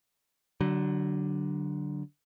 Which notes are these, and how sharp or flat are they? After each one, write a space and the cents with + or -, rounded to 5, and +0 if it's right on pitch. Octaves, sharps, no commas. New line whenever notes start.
D3 +0 F#3 +25